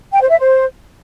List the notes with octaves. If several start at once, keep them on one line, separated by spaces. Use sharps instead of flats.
G5
C5
E5
C5